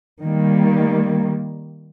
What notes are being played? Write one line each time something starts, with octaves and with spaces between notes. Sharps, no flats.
D#3 G3 A#3